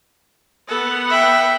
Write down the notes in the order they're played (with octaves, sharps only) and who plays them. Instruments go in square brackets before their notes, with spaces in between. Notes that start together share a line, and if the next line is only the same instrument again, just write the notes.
[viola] B3 F#5 [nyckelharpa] A4
[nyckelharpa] E5 G5